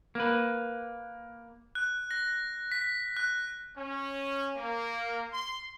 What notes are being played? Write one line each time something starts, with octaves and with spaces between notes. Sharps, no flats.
A#3 B4
F#6
A#6
B6
F#6
C#4
A#3
C6